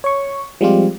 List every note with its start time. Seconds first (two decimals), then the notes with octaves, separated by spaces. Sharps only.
0.04 C#5 C#6
0.61 F3 G3 G#3 C4 F4 G4